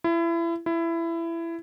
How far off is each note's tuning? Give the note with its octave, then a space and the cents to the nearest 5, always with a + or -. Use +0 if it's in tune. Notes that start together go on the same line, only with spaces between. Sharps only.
E4 +30
E4 +20